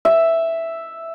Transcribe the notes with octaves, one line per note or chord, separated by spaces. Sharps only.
E5